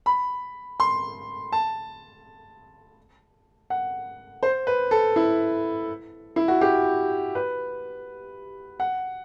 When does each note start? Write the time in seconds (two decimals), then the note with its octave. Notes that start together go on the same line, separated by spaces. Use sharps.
0.06 B5
0.80 C6
1.52 A5
3.70 F#5
4.43 C5
4.67 B4
4.91 A4
5.16 E4
6.36 E4
6.48 F#4
6.61 G4
7.35 B4
8.80 F#5